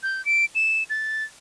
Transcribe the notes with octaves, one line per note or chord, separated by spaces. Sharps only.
G6
D7
E7
A6